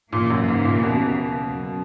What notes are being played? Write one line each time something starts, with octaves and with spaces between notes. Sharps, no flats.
D#2 A#2 C#3 E3 A#3
F#2
G#2
A#2
B2
F#2